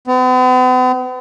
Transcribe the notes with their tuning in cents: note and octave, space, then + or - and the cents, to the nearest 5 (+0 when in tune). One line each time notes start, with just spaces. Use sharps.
B3 +45